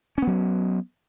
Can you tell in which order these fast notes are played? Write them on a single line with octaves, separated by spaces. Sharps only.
C#4 B3 F#3